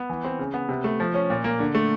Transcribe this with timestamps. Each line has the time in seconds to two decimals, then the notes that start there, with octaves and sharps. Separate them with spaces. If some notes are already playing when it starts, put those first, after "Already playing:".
Already playing: B3
0.09 E3
0.24 C4
0.39 C#3
0.54 B3
0.69 C3
0.84 A3
1.00 F3
1.14 C#4
1.30 A#2
1.44 A#3
1.59 D3
1.75 A3